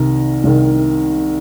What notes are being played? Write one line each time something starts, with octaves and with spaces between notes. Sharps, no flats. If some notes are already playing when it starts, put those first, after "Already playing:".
Already playing: C2 C3 D#3 A#4
C2 C3 D#3